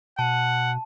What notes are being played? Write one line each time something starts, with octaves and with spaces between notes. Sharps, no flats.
B2 F#5 A5